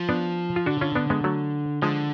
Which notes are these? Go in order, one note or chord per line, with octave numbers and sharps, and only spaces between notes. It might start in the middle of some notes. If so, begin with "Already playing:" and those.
Already playing: F3
B3 D4
F4
D3 D4 F#4
C#4 F4
B3 D4
G#3 B3
F#3 A3
D3 F3 G#3